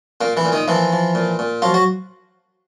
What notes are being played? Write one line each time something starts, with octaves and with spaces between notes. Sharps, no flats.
A#2 A#3
E3 E4
A#2
D#3 D#4
E3 F3 E4
F3
A#2
A#2
F3 F#3 F4
F#3 F#4